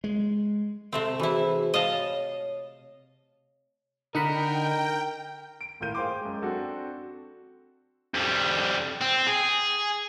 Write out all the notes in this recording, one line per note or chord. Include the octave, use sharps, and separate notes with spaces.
G#3
C3 A3 C4 A4
E3 E4 F#4 G#4 C5
D#5 F5 A5
C#5
D3 D#4 A#4 F#5 G5 B5
D7
D#1 A2 F4 A#4 G6 D#7
G#4 C5 F5 G5 C6 D6
F#2 G#3
C4 D4 F#4 A4 F#5 G5
F2 G3
C4
G#4